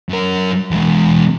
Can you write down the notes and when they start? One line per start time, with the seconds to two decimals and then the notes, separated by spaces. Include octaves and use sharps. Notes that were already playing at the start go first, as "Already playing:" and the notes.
0.09 F#2 A#4
0.71 E2 G#3